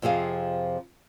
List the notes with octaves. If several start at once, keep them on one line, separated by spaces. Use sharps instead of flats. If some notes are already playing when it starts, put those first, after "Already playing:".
F2 C3 F3 G#4 F5